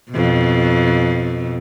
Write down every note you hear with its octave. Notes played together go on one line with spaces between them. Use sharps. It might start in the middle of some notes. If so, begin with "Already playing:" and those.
F2 B2